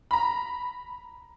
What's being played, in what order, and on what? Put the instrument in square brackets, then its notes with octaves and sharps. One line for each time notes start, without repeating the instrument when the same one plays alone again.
[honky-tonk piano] A#5 B5